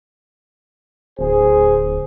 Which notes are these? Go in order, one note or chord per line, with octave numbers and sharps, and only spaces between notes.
D1 G#4 C5